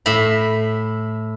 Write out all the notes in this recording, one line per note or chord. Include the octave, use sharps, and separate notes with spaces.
A2 E5 B5